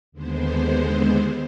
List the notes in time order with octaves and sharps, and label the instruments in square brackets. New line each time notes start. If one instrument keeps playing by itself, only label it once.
[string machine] D#2 D3 G#3 B3 C5